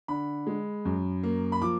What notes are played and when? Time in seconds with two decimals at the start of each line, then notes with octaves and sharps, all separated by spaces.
0.08 D3 B5
0.47 G#3
0.85 F#2
1.23 A#3
1.52 B5
1.61 F3 D6